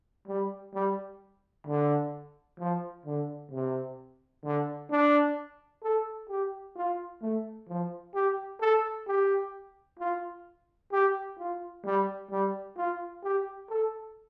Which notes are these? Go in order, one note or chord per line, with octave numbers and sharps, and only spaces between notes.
G3
G3
D3
F3
D3
C3
D3
D4
A4
G4
F4
A3
F3
G4
A4
G4
F4
G4
F4
G3
G3
F4
G4
A4